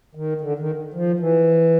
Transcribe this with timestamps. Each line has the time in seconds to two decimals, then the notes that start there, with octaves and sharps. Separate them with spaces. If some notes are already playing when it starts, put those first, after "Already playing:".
0.15 D#3
0.41 D3
0.59 D#3
0.94 F3
1.20 E3